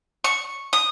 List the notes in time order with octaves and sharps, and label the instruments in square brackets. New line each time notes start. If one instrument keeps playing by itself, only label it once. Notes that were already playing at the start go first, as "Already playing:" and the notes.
[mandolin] C#6
D#6